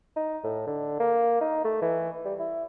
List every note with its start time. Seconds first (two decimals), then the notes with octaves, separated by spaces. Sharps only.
0.16 D#4
0.44 A2
0.67 D3
1.00 A#3
1.41 D#4
1.64 A3
1.82 E3
2.25 G3
2.39 E4